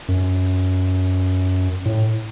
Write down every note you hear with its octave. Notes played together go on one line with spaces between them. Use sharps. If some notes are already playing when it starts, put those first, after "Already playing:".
F#2
A2